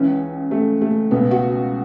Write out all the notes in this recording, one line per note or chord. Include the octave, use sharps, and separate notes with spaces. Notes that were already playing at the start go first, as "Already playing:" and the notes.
Already playing: C#2 C#3 E3 C#4
A3
A3
C#2 B2 B3
F#4